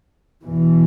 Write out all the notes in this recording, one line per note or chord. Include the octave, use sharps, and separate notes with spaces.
E2 B2 E3